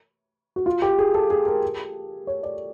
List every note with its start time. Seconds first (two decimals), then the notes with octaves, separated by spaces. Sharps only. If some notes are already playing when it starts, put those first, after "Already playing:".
0.56 F#4
0.66 F4
0.82 G4
0.99 G#4
1.14 A4
1.30 G#4
1.46 A#4
2.27 C#5
2.43 D5